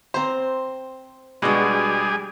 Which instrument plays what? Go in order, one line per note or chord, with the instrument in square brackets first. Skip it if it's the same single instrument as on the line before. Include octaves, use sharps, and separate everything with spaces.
[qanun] C4 A#5 [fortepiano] C5
[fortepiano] B2 G#3 D4 [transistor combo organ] G3 G#4 [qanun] F#4 F#5